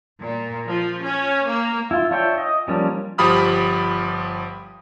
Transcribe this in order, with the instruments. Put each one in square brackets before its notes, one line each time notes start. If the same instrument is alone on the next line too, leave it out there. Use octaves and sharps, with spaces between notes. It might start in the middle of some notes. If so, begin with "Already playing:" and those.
[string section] A#2
F3
C#4
A#3
[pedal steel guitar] E4 F4
D4 F4 C#5 E5 G5
D#5
F3 G3 A#3 C#4 D4
[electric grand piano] G1 F3 G4 B5 D#6 F6